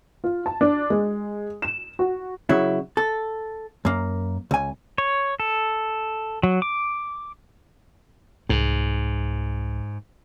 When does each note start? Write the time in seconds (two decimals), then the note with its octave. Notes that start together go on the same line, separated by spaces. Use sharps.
0.24 F4
0.46 A5
0.61 D4
0.90 G#3
1.62 E7
1.99 F#4
2.49 C#3 F#3 E4
2.97 A4
3.85 F#2 A#3
4.51 C#2 G#5
4.98 C#5
5.40 A4
6.43 F#3
6.62 D6
8.49 C2 G#2